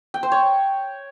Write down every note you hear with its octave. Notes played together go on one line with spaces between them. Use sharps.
G5
C5
C#5